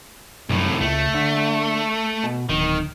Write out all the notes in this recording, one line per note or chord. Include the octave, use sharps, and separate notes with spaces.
C2 F#2 A2
C#2 A3
D3
B2
D1 D#3